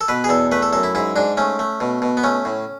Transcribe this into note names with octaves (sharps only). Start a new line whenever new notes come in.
A4
B2 B4
G#4
E2 A4
A3 B4
A4
F#2 A4
E4
G#2 E4
G#2 D4
A3 C#4
A3
B2
B2
B3
A3 C#4
A2